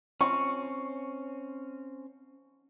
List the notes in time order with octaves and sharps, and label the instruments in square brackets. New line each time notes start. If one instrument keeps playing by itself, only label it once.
[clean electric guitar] C4 C#4 [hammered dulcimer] C#6